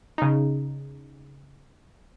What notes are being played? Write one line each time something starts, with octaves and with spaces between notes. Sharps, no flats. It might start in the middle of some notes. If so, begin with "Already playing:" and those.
C#3 D#4